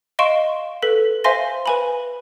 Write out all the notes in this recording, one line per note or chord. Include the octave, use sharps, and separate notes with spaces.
D#5 F5 C6 C#6 D7 E7
A4 B4 B6
C5 E5 F5 G#5 C6 A#6
B4 G#5 B5